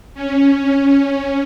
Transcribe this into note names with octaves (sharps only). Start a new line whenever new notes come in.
C#4